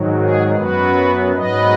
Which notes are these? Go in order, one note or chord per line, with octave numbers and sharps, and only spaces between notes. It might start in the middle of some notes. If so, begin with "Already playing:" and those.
Already playing: G#2 D#3 F#3
G#4
F#2 F#3 B3 F#4 B4
G#2 F#3 B3 B4 D#5